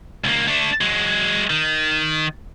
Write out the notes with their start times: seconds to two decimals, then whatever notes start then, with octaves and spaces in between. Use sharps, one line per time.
0.24 C#2 A#3
0.48 A3 D4
0.81 F#3 G#3
1.50 D#3